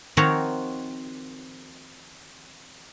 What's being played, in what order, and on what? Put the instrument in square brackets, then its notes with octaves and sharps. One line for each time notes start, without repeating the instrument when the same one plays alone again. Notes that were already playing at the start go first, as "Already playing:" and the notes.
[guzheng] D#3 F3 C4 F#4 A#4 C#5